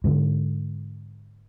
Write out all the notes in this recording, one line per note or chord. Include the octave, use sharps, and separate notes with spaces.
G#2 D3